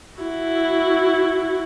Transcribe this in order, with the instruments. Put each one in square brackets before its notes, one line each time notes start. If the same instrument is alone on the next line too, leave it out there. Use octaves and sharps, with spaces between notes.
[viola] E4 F#4